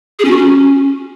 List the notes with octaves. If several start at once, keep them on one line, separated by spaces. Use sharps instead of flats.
G#4
C#4
F#4
C#4